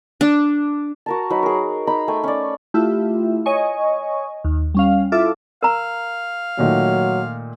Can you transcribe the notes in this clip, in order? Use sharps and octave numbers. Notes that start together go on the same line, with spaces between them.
D4
F#4 A#4 A5
F#3 D#4 B4
G#4 A#4
D#4 A#5 B5
A3 G5 G#5
C#4 D5
A3 E4 F4 G4 E5
C#5 D#5 G#5 C#6
D#2
G3 C#4 F5
E4 F4 A4 E5 D6
A#4 F5 A#5
A#2 D#3 F#3 A3